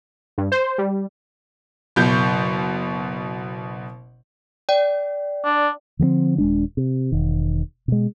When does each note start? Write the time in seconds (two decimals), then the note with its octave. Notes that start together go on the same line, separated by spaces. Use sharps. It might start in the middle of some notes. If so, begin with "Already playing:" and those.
0.38 G2
0.52 C5
0.78 G3
1.96 F#1 B2 G6
4.69 D5 G5
5.44 D4
5.99 D3 F3 G3 C4
6.38 D#1 G#3 D4
6.77 C3
7.12 E1 D#3
7.88 B2 G#3